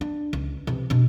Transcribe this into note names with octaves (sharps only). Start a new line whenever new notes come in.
D4
C#2
C3 E3
B2 D4